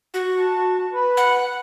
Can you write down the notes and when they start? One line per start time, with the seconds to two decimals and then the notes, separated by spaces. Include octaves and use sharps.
0.14 F#4
0.38 A5
0.93 B4
1.17 F#5